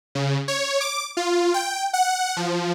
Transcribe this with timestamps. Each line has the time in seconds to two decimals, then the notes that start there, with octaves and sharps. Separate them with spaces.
0.15 C#3
0.48 C#5
0.81 D6
1.17 F4
1.54 G5
1.93 F#5
2.37 F3